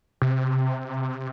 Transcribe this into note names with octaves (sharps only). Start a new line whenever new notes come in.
C3